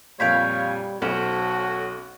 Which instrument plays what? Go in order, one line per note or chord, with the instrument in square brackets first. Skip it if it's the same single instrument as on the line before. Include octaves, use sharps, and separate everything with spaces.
[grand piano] F2 A#2 [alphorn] G3 [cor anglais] C#5 [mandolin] F5 G5 B5
[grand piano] B1 [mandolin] C#4 C5 [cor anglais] F#4 [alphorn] A4